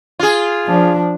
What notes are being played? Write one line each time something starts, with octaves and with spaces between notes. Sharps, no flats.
F4 G#4
F3 D4